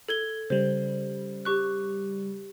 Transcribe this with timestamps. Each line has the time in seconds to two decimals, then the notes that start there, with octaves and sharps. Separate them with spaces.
0.09 A4 G#6 G7
0.50 C#3 G3 C5
1.45 G4 C#6 F#6